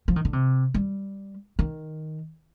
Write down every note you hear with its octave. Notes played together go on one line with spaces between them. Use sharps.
F3
D#3
D3
C3
G3
D#3